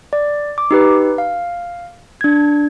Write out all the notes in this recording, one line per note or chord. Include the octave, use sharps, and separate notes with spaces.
D5
D6
D#4 G4 B4
F5
D4 G#6